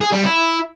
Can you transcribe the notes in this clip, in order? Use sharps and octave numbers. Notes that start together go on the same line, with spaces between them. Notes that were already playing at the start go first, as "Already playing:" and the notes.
G#4
G3
E4